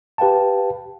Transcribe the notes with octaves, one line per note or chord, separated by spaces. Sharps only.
G4 B4 F5 G5 A5